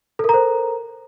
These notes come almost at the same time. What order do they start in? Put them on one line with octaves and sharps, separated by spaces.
A4 A#4 A#5 C5